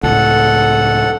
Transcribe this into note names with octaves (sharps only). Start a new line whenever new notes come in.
C#2 A2 A4 F#5